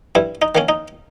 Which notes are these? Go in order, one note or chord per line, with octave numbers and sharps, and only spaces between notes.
G2 E4
D#4
D#3 A#3 C#4
D#4